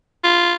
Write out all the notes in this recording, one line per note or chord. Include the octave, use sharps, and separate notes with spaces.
F4